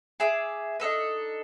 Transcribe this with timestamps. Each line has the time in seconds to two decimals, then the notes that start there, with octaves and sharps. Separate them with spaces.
0.20 G#4 E5 D6
0.80 D4 D#4 A4 B4